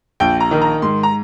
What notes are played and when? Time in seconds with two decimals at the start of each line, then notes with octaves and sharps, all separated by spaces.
0.20 A#1 G5
0.40 A#5
0.51 D#3
0.62 A#5
0.82 G#2 C6
1.03 A#5